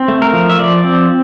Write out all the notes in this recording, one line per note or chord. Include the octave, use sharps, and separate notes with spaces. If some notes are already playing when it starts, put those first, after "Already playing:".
Already playing: C4
A3
A#4
F3
E5
F3 D5
C4